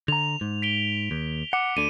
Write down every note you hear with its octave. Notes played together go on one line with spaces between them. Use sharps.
D3 A#5 F7
G#2
B6 D7 G7
D#2
F#5 D6 C#7
D2 D3 D#7